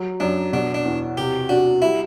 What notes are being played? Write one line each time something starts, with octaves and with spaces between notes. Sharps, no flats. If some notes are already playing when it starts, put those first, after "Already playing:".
Already playing: F#3
F#2 D4
B2 D4
D4
E2
C3 G4
D4 F#4
G3 E4